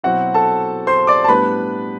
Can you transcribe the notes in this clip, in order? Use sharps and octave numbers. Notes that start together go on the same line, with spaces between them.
B2 F#3 C4 E4 F#4 F#5
A4 A5
C5 C6
D5 D6
A5
A2 G3 B3 D4 B4 B5